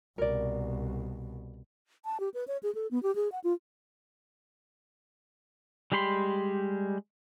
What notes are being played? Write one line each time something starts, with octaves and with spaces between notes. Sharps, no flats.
C2 B2 A#4 D5
A5
G4
B4
C#5
G#4
A4
B3
G4
G#4
F#5
F4
G3 G#3 G4 B5 C6